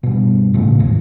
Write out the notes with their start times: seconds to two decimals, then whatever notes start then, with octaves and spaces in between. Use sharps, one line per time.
0.03 G2 B2
0.54 A2 C#3 F#3 A3
0.80 D#1 G#1 D#2 G#2